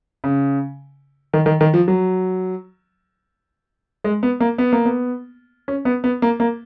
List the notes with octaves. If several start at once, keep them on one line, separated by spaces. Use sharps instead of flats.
C#3
D#3
D#3
D#3
F3
F#3
G#3
B3
A#3
B3
A#3
B3
C#4
B3
B3
A#3
A#3